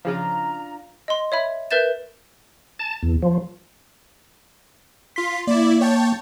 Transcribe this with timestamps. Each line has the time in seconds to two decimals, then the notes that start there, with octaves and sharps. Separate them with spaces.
0.05 C#3 F3 D4 F4 A#5
1.08 D#5 C6
1.32 C#5 E5 B5
1.71 A#4 B4 E5 G6 A6 E7
2.79 A5
3.03 E2
3.23 F3
5.16 F4 C6 B6
5.47 A#3 E4 D5
5.81 C#5 G5 A5